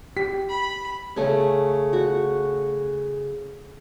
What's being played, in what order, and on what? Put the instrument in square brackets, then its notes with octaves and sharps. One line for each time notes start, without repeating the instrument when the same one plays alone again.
[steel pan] G4 [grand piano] B6
[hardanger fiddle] B5
[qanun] C#3 A3 C#4
F#4